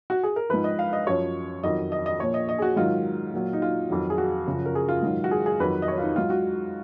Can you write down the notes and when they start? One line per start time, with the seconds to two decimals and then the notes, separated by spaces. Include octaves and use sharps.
0.10 F#4
0.23 G#4
0.36 A#4
0.49 G#2 F3 B4
0.64 D#5
0.79 F5
0.93 D#5
1.07 F#2 F3 C#5
1.63 F2 D#3 F#3 D#5
1.92 D#5
2.06 D#5
2.20 A#2 F3 C#5
2.34 D#5
2.49 D#5
2.59 G#4
2.62 F#4
2.76 G#2 D#3 F#3 F4
3.33 A#2 F#3
3.53 D#4
3.62 F4
3.90 F2 D#3 F#3
4.10 G#4
4.18 F#4
4.47 F#2 C#3 F3
4.66 A#4
4.75 G#4
4.89 F4
5.03 G#2 D#3 F#3
5.24 F#4
5.31 G#4
5.46 G#4
5.60 F2 D#3 F#3 B4
5.82 D#5
5.88 C#5
5.98 F4
6.02 D#4
6.16 G#2 F#3 F4
6.30 F#4